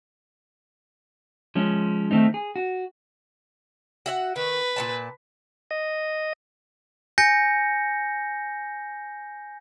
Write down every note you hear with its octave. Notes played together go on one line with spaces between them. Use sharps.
F3 G#3 C#4
D#3 A3 C4 D#4
G#4
F#4
F#4 E5 F#5
D#3 B4
A#2 C#4 A5
D#5
G#5 G6 A#6 C#7